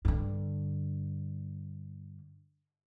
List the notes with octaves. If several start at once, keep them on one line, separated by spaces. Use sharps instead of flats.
G2 D3